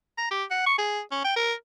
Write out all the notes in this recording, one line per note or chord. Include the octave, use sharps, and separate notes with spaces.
A#5
G4
F#5
C#6
G#4
C#4
G5
A#4